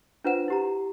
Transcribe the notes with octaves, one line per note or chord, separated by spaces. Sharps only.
D4 F4 B4 C5 F#5 E7
E4 G4 A#5